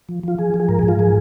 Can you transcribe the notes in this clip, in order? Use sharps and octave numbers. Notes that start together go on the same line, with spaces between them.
F3
F3 F4
F3 G#4
F3
G#4
G#2 A#4
G#2 G#4
F4
F3 G#4